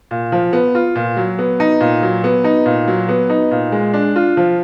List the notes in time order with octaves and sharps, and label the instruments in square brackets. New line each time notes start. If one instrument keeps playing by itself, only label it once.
[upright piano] A#2
F3
B3
F4
A#2
F#3
B3
D#4
A#2
F#3
B3
D#4
A#2
F#3
B3
D#4
A#2
G#3
D4
F4
F3